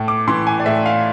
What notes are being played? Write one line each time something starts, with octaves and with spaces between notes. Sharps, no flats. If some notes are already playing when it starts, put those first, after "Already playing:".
Already playing: A2
D6
E3 C6
G#5
D5
A2 E5
F5